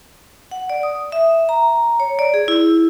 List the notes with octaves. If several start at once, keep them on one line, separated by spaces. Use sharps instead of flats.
F#5
D5
D#6
E5
A#5
C#5
D5
G#4
E4